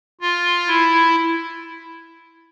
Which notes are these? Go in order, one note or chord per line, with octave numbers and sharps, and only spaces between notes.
F4
E4